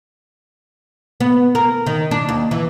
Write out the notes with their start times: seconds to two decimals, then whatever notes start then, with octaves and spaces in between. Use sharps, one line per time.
1.20 B3
1.55 A#4
1.86 D#3
2.11 D4
2.29 D#2
2.51 E3